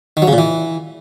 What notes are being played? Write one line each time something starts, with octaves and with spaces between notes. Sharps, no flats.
D#3
F#3
C#3
A#2
E3